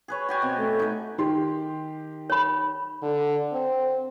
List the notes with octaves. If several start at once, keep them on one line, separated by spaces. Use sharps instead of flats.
G#4 B4 C#5
F#4 G4 G#5
B2 C4
A3
D#4 B4
D#3 G4 C6
C#5 B5
D3
C4